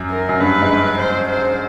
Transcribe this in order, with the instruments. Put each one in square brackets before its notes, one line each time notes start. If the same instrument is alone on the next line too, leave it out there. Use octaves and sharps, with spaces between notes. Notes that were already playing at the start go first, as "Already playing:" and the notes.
Already playing: [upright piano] F#2
[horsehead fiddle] A#4
[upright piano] F#2
[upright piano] G2 [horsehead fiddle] B4
[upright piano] G#2
G2
[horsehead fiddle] C5
C5